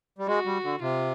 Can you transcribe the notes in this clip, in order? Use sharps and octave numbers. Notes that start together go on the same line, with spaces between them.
G3
G#3 F#4
G3
D3
C3 F4